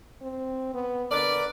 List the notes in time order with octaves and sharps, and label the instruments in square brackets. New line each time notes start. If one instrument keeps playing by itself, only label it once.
[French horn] C4
B3
[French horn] D3 [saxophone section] A#4 B4 D5